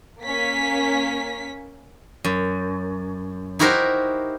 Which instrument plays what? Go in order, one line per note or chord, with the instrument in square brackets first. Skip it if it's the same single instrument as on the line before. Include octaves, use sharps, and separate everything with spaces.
[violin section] A#3 C#4 B6
[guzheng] F#2
D#4 E4 F#4 G4 A#4 C5